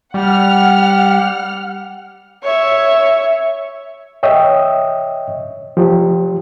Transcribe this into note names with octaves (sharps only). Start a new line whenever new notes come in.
G3 F#5 F6
C#5 E5
C#5 D#5 E5 G5
F3 G4